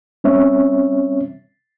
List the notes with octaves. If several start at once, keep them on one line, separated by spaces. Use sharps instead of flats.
G3 C4 C#4 C#5 E5